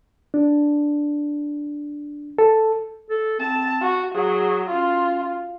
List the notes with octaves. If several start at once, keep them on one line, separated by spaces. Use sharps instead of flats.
D4
A4
A4
C4 A5
F#4
F#3 G#4
C#4 F4